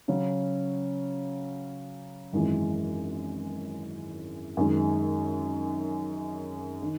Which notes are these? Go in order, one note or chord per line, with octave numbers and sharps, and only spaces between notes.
C#3 F#3 C#4
G#1 F#2 E3 G#3
F#2 D#3 G#3
D#3